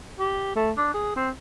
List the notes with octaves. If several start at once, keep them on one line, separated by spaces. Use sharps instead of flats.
G4
A3
D4
G#4
C4